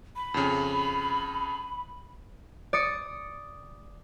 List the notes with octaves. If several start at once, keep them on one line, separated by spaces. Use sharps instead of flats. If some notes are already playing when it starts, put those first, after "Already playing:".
B5
F2 C#3
D5 D#6 C#7